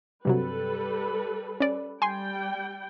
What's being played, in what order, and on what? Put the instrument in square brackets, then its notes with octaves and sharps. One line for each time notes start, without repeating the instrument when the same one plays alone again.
[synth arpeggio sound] G2 C3 F#3 [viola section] G3 A4 B4
[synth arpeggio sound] C#4 D5
[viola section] G3 G5 [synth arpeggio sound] G#5 C6